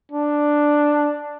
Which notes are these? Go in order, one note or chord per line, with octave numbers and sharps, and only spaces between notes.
D4